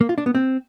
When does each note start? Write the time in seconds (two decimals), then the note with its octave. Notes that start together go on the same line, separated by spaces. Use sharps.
0.01 A#3
0.09 F4
0.18 D4
0.26 B3
0.35 C4